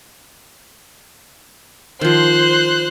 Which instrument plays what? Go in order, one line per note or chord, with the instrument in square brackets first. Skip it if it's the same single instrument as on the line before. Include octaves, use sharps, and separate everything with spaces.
[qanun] D#3 F3 [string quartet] C5 C6 F#6